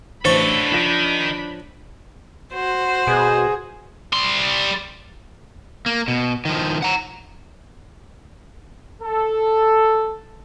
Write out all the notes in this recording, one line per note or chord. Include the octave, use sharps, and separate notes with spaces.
A1 F#3 D4 A4 C5 C#5 B5 A6
D#3 F3 A#6
F#4 C5
B2 G#4
G3 C6
A#3
B2
D#3 F3
F#5 A#5
A4